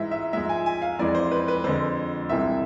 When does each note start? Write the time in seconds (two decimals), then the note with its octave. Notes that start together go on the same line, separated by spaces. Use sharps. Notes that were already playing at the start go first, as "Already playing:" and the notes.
Already playing: G#2 E3 G#3 E5
0.11 E5
0.33 G#2 F3 G#3 E5
0.49 G#5
0.66 G#5
0.82 F5
0.99 F2 E3 G#3 D5
1.15 C5
1.31 B4
1.48 B4
1.64 F2 D3 G#3 C5
2.29 C2 C3 E3 G#3 E5